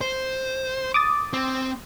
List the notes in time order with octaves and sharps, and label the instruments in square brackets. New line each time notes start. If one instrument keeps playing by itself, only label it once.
[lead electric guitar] C5
[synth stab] D6 D#6 A6
[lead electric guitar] C4